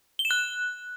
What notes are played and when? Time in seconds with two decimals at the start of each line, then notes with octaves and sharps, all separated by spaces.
0.19 G7
0.25 E7
0.31 F#6